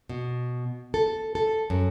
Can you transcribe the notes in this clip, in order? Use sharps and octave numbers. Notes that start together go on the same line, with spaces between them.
B2
A4
A4
F#2